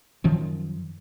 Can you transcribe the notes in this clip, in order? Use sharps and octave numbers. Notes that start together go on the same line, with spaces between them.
F#2 D#3 F3